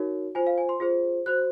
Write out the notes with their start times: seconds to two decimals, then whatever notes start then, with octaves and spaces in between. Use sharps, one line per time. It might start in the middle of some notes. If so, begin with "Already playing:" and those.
Already playing: D#4 F#4 A#4 C#5
0.35 F4 C5 G#5
0.47 F5
0.58 G#5
0.69 C6
0.80 F4 G#4 C5
1.26 F#4 C5 F#6